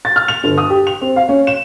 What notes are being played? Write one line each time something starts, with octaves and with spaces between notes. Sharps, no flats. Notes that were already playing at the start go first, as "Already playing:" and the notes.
A6
F6
F7
G1
D#6
G4
F7
C4
F5
C#4
E7